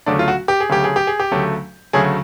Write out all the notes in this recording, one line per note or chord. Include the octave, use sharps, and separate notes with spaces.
D2 C#3 F#3 A3 D4
F4
F#4
G4
G#4
D2 C#3 F#3 A3 G4
G#4
G4
G#4
G4
D2 C#3 F#3 A3
D2 C#3 F#3 A3 G#4